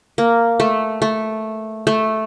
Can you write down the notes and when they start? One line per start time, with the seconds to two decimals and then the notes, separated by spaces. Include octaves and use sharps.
0.18 A#3
0.60 A3
1.02 A3
1.87 A3